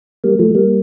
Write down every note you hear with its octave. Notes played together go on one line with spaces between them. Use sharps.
G3 A#3
F3 A3
G3 A#3